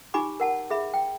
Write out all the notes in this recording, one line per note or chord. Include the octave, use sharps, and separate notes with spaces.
D#4 G4 G#5 B5 D6
A#4 F#5 A5
G#4 E5 B5
G5